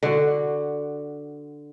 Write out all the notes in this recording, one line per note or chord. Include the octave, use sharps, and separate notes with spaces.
D3 F#4